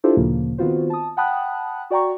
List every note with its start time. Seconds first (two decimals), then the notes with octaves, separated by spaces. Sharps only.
0.04 D4 E4 F4 G4 A4 C5
0.17 D2 A#2 C#3 F3 A#3
0.58 D#3 B3 C4 F4 F#4 C5
0.90 A5 D#6
1.17 F#5 G5 A5 B5 D#6 F#6
1.90 F#4 D5 G5 A#5 C#6